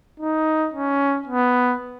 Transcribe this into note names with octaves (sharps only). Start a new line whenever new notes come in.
D#4
C#4
B3